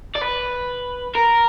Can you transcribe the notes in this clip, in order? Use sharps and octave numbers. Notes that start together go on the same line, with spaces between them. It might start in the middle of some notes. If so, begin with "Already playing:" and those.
D5
B4
A#4